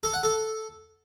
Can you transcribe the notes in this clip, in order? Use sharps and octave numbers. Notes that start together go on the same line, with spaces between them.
A4
F#5
A4